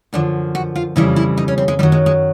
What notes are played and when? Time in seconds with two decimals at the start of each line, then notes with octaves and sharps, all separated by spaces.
0.13 F#2 D3 F3 D4
0.55 F#4
0.75 F4
0.96 F2 C#3 E3 G3 E4
1.16 E4
1.37 D#4
1.48 C#4
1.58 C4
1.68 G#3
1.79 F#2 D#3 F#3 G3
1.92 G#3
2.06 G#3